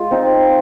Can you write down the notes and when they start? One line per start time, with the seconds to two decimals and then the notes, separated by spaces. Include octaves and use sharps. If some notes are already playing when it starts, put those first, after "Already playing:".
Already playing: G#3 F4
0.11 C4 D#4